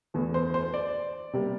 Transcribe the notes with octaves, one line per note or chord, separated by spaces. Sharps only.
E2 E3 A3
C5
C5
D5
C3 G3 A#3